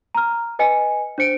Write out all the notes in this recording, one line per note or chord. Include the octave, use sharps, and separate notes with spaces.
A#5 F6
B4 D#5 G#5 C#7
D4 C5 C#7 D7